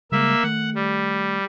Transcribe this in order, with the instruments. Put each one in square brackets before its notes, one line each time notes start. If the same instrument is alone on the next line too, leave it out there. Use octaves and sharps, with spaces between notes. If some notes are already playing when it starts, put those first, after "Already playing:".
[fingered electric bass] C#3 G3 G#3 [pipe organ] A#3 E5
[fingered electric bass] D#3 A3 [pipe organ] F#5
[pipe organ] G3